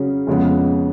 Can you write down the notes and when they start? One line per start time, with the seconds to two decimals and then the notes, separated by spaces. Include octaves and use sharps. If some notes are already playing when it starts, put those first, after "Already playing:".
Already playing: C#3 F#3 C#4 G#4
0.27 F2 C#3 G#3 B3